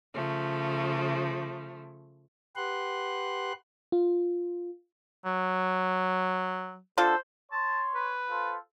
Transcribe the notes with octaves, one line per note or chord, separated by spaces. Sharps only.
C#3 F3 A3
G4 B4 F#5 C6 F#6
F4
F#3
D3 F4 A4 C5
C#5 A5 C6
B4
F4 A4 C5